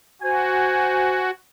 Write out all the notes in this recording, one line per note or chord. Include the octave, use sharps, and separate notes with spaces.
F#4 C5 G#5